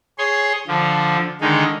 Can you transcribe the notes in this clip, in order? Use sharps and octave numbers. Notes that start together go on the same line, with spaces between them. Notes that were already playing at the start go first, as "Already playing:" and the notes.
G#4 C#5 C6
D3 F3
D3 D#3 G#3 D#4